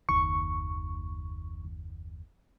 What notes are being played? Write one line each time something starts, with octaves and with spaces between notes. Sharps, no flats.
F#1 D#2 D#3 C#6